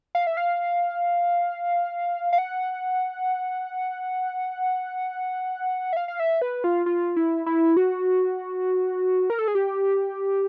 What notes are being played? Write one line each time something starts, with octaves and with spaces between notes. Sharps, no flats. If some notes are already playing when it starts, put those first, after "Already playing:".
F5
E5
F5
F5
F#5
E5
F5
F5
E5
B4
F4
F4
E4
E4
F#4
A#4
A4
G#4
G4